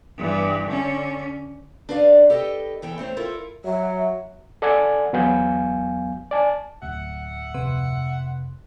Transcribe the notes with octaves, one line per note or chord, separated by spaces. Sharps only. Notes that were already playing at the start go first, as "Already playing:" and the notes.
G2 E3
D3 C#4
D4 F#4 B4 D5 F5
G4 A4 B4 D5 D#5 G5
E2 E3 A4 G5
A3 C4 C5 C#5
E4 F4 A4 A#4
F#3 E5
A4 D5 F#5 G#5 G#6
E2 F#3 B3 F5 G#5 G6
D5 G#5 A5
D1 E5 F#5
F2 C3 B4